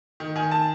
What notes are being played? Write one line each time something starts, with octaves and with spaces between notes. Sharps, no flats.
D#3
D#3 G#5
A5